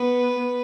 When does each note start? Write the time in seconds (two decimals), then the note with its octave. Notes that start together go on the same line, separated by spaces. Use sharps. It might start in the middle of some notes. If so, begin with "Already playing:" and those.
Already playing: B3 B4